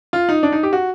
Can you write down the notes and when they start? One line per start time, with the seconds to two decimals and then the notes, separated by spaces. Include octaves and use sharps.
0.13 F4
0.29 D#4
0.43 D4
0.52 D#4
0.63 G4
0.73 F#4